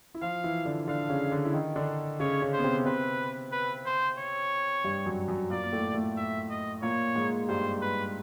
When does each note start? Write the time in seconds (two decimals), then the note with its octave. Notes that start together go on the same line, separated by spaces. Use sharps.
0.15 E4
0.22 F3 F4 F5
0.44 E3 E4
0.65 D3 D4
0.88 D3 D4 F5
1.10 C#3 C#4
1.31 D3 D4
1.45 E4
1.54 D#3 D#4
1.76 D3 D4
2.20 C#3 C#4 C#5
2.42 C#3 C#4
2.53 C5
2.59 B3
2.64 C3 C4
2.86 C3 C4 B4
3.52 B4
3.86 C5
4.18 C#5
4.84 G2 G3
5.06 F#2 F#3
5.28 F#2 F#3
5.50 A#2 A#3 D5
5.63 A#3
5.72 A2 A3
5.94 A2 A3
6.17 E5
6.50 D#5
6.82 A#2 A#3 C#5
7.15 G#2 G#3
7.48 G2 G3 C5
7.82 B4